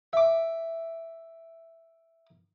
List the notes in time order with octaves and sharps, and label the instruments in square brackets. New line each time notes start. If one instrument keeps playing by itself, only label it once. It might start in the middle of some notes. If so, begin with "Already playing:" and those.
[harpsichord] E5 D6